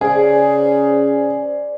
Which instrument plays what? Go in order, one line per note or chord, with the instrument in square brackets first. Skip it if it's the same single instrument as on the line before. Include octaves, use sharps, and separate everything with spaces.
[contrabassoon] C#3 [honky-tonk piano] G#4 [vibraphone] C5 D5